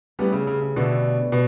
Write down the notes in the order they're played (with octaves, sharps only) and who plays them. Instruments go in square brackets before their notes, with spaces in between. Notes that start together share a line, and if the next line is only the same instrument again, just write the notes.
[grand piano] G3 B3 [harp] A3 C#4 E4 G4 B4
[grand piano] C#3
C#3
C#3
[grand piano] B2 D3 [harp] B3 D4 G4 C#5 E5
[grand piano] B2